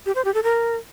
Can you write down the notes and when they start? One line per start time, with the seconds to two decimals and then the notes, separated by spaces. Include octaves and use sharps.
0.06 G4
0.15 C5
0.25 G4
0.34 A4
0.44 A#4